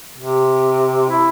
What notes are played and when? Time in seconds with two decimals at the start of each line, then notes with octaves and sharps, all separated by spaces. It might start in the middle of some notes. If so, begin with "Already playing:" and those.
0.18 C3
1.09 E4